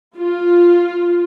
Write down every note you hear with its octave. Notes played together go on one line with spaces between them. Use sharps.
F4